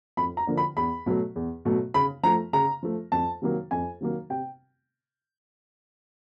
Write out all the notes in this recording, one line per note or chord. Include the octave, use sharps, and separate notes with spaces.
F2 B5
A#5
D3 F3 A#3
B5
E2 B5
B2 F#3 A3
E2
B2 F#3 A3
C#3 B5
F3 A3 A#5
C#3 A#5
F3 A3
F2 A5
C3 D#3 F#3 A#3
F2 G#5
C3 D#3 F#3 A#3
C3 G5